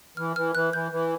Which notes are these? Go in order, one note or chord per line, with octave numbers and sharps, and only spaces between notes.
E3 F6
E3 F6
E3 F#6
E3 G6
E3